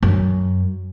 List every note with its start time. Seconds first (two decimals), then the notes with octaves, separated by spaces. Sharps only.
0.03 F#2